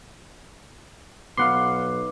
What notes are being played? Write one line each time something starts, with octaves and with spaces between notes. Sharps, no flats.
B1 B3 F5 F#5 C6 D6 C#7